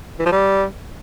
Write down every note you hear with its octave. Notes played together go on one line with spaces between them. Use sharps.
E3
F3
G3